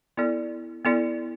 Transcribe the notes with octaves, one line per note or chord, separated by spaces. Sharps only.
B3 E4 A4 D5
B3 E4 A4 D5